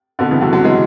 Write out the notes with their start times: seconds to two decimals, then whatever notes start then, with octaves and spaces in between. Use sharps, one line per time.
0.19 B2 D3
0.31 C#3 E3
0.41 D3 F#3
0.53 D3 F#3
0.64 E3 G#3